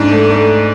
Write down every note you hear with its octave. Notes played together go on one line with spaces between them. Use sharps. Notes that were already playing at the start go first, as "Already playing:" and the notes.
Already playing: G#2 D4
A3
A3